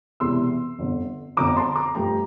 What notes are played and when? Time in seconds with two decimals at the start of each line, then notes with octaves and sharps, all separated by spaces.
0.20 E1 E2 C3 E3 C6 E6
0.79 G1 F2 D3
1.37 G1 F2 D3 A#5 D6
1.57 A5 C6
1.76 A#5 D6
1.95 G2 F3 A3 G5 A#5